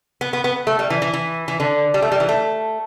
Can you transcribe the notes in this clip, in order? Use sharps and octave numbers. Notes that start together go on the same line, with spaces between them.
B3
B3
B3
A3
G3
E3
E3
E3
E3
D3
G3
A3
G3
E3
A3